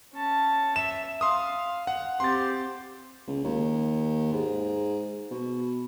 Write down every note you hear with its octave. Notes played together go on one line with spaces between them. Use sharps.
C#4 A5
E5 E7
F5 C6 D#6
F#5
C4 G4 C6 A6
C#2
D#2
G#2
B2